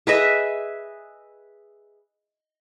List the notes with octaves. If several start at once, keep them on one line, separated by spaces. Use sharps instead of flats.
G#4 B4 D#5 E5